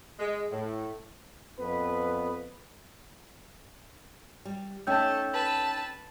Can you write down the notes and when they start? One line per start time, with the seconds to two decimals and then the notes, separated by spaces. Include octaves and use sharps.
0.19 G#3
0.51 A2
1.59 F2 B3 B4
4.45 G3
4.87 A3 C#4 D#4 G5 A5 E6 G6
5.33 B4 A5